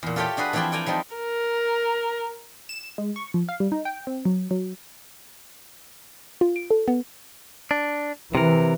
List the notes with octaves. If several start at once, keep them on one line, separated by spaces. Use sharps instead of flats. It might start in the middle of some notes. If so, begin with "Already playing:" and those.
E2 A#2
F4 G4 A4 C#5 E5 G5
D4 F#4 G#4 B4
E3 F3 C4 E4 D5 G5
A4 D5 G5 G#5 A#5
F3 G3 C4 D#4
A#4
E7
G#3
C#6
F3
F5
G3
D#4
G5
C4
F#3
F#3
F4
D7
A4
B3
D4
C3 E3 A#4